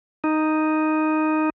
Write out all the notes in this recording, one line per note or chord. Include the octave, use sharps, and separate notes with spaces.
D#4